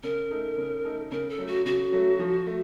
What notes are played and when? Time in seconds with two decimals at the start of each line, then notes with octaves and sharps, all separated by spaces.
0.03 C#3 A#4
0.30 A3 D#4 A4
0.58 C#3
0.85 A3 D#4 A4
1.12 C#3 A#4
1.29 A4
1.38 F#3 A3
1.47 F#4
1.65 C#3 F#4
1.92 F#3 A3
2.19 F3
2.46 A3